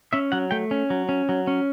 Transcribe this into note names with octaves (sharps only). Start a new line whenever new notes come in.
C#4 E5
F#3 F#5
A3 G5
C#4
F#3
C#4
F#3
C#4